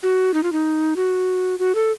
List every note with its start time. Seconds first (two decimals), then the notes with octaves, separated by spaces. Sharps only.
0.03 F#4
0.34 D#4
0.43 F4
0.52 D#4
0.96 F#4
1.59 F#4
1.75 A4